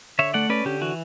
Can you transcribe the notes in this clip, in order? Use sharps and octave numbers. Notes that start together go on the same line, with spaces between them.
D3 C#5 E5
A3 D5 F#5
C#4 B4 D5
D3 G4
E3 F#4